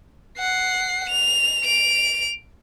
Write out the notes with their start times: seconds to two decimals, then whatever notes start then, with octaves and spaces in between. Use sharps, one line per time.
0.38 F#5 C7
1.10 F7
1.64 D7 F7